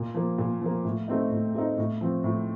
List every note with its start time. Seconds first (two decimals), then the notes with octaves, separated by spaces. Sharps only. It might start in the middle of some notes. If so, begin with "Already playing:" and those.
Already playing: A#2
0.14 F3 A#3
0.38 A#2
0.61 F3 A#3
0.85 A2
1.08 A3 C4 D#4
1.31 A2
1.55 A3 C4 D#4
1.78 A2
2.01 F3 C4
2.24 A2